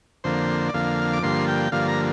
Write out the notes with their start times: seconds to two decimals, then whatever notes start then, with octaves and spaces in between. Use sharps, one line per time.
0.24 F2 D3 A#3 C5
0.69 D5
0.74 F2 D3 A#3 F5
1.13 D6
1.23 G2 D3 F3 A#3 C6
1.48 G5
1.72 G2 D3 F3 A#3 F5
1.88 A#5